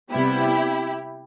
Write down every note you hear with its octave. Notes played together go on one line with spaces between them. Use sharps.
C3 G3 B3 E4 G4